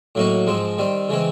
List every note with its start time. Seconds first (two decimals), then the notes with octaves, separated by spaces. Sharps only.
0.15 A2 F#3 A#3 D#4 F#4
0.47 G#2 F3 G#3 C4
0.78 D#3 G3 C4
1.09 C#3 E3 G#3 C4